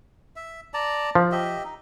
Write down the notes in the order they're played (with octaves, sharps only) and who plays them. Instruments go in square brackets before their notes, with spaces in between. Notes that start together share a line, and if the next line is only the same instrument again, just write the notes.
[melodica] E5
D5 A5 A#5
[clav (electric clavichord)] F3
[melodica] G4 D#5 E5
D#4